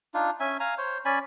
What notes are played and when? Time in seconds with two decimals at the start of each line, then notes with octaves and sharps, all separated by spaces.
0.14 D4 D#4 F4
0.40 C#4 E5 G#5
0.60 F5 G#5 A#5
0.78 C5 C#5
1.05 C#4 D5 G#5 B5